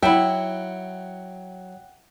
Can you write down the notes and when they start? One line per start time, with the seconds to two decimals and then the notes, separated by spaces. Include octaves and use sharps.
0.03 F#3 E4 E5 F#5 G5